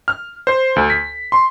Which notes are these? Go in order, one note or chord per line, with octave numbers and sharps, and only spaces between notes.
F6
C5
D2
B6
C6